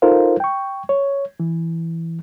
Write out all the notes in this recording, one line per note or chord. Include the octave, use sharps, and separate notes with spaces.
D#4 F4 A4 A#4 C5 F5
G5 C#6
C#5
E3